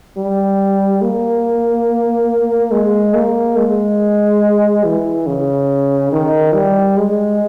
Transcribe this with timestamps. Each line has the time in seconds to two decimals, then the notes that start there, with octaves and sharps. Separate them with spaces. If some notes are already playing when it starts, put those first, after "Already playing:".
0.17 G3
1.02 A#3
2.71 G#3
3.14 A#3
3.56 G#3
4.85 E3
5.27 C#3
6.12 D#3
6.54 G3
6.97 G#3